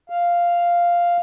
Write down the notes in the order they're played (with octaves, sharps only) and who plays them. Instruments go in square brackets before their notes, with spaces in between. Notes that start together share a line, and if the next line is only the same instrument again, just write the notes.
[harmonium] F5